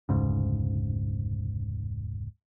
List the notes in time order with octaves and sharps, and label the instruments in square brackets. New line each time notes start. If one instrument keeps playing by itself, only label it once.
[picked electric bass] F1 D2 G#2 C#3